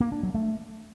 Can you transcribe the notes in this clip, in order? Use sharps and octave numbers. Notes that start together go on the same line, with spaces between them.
A#3
D4
F#3
A3